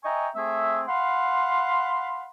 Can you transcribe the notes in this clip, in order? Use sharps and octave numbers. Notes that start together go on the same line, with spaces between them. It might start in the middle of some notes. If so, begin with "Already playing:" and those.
D#5 E5 G5 G#5 A#5 C#6
A3 C4 G#4 E5
F5 F#5 B5 C6